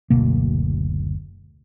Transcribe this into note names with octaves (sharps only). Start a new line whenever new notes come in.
F#1 D2 B2 A#3